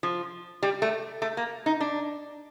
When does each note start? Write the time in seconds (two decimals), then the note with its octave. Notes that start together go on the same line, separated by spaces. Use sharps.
0.03 F3
0.63 G3
0.82 A3
1.22 A3
1.37 A#3
1.66 D#4
1.81 D4